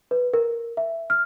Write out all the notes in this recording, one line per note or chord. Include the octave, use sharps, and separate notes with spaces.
B4
A#4
E5
F6